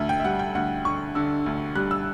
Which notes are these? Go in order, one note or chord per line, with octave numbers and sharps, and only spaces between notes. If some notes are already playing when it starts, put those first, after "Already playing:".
Already playing: D2 E5
G5
E5
G3 F#5
G5
D2 F#5
D3 C#6
D3 E6
D2
G3 F#6
E6